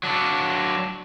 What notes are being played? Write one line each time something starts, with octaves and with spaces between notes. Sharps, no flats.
F#3 D4